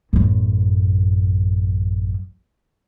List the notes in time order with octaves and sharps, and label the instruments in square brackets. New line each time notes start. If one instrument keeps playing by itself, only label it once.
[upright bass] A1 F#2